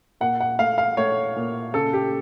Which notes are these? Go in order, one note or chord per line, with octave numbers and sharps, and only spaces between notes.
A#2 F#5
F#5
A3 F5
F5
A3 C#5
A#2
C#3 A4
G4